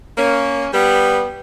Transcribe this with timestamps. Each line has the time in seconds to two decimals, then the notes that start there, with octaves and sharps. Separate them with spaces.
0.16 A#3 C#4
0.73 G3 B3